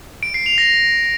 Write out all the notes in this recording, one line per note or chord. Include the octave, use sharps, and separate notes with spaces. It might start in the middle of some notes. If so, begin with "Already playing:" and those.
D7
C7
F7
A#6